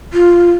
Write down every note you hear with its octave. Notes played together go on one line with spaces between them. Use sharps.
F4